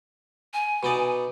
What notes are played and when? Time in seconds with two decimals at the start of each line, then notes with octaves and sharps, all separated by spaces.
0.54 G#5
0.83 B2 D#4 D5